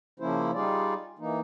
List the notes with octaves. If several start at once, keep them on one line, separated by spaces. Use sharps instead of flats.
C#3 F3 A#3 C#4 E4 C5
G3 D#4 F4 G#4 D5
E3 A#3 D#4